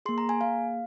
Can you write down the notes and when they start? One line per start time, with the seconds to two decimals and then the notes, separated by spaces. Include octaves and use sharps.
0.06 A#3 G#4 C6
0.18 A#5
0.29 G#5
0.41 A#3 G#4 F5